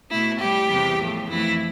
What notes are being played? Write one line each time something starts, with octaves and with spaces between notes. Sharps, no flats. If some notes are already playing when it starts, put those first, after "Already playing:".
B2 A3 E4
A2 G3 G4
E2 C3 G3
A2 F3 A3
F2 E3 A3 E4